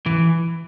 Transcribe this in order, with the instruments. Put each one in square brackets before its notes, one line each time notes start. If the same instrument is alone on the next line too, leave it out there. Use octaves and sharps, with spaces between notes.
[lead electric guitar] E3